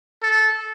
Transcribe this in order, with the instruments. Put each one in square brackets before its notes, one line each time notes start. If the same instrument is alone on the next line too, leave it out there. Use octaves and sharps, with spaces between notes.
[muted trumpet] A4